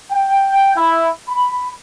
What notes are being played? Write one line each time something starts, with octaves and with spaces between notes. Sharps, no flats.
G5
E4
B5